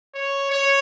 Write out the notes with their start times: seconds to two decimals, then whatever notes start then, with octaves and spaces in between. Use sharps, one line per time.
0.15 C#5
0.51 C#5